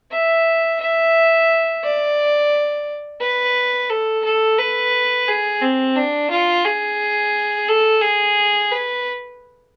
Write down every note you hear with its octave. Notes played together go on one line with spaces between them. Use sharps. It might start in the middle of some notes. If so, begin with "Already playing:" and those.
E5
E5
D5
B4
A4
A4
B4
G#4
C4
D4
F4
G#4
A4
G#4
B4